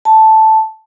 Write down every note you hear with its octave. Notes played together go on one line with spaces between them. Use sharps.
A5